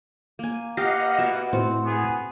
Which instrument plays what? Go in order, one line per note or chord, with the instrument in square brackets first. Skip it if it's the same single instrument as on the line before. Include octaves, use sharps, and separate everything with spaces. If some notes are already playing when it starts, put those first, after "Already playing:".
[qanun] A#3 G#5
[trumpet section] A#3 B3 F#5 [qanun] G4 [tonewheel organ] D#5 F5
[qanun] B2 E5
[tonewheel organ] A2 [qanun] C4 F#4
[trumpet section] B3 G#4